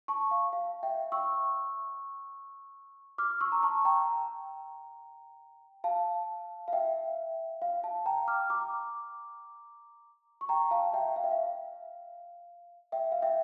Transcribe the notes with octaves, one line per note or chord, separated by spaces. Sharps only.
A5 C#6
F5
F5
E5 G5
C#6 E6
D6 F6
C#6 E6
A#5
A5 C#6
G5 A#5
F5 A5
F5
E5 G5
F5
F5 A5
G5 A#5
D6 F6
A#5 D6
C#6
G5 A#5
F5 A5
E5 G5
F5
E5
F5
E5 G5
F5
E5 G5